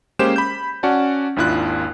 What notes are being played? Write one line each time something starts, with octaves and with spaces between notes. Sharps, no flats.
G#3 A#3 C#4 G4 C5 E7
B5 G6
C#4 F#4 D5 F#5 A5
G#1 D#2 D4 E4 F4 F#6